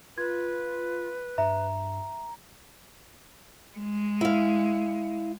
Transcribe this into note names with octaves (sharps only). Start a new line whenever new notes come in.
F4 B4 G#6
G2 E5 A#5
G#3
E4 F5